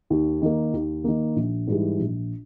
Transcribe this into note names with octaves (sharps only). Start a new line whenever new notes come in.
D#2
D#3 A#3
D#2
D#3 A#3
A#1
G#2 E3 G3
A#1